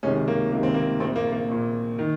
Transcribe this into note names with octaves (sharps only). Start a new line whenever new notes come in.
C#2 C3 D#3 C#4
A#3
C#2 C3 D#3 A#3
C4
A#3
A#1 A#2 C4
A#3
A#3
A#1 A#2
D#3